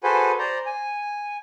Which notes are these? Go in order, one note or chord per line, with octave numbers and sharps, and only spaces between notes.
F#4 G#4 A4 B4 C5 G#5
C5 D5 A#5
G#5